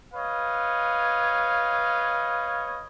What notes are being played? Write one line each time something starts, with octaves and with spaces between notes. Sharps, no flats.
B4 C#5 D#5 F5